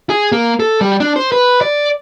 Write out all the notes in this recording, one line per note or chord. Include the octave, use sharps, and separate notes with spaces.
G#4
A#3
A4
G3
D4
C5
B4
D5